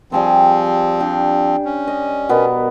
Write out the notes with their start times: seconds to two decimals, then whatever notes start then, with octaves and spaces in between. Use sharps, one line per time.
0.12 F3 G3 C4 G#4 C6
1.00 D4 G4
1.65 C#4
1.87 D#5
2.29 B2 B3 A#4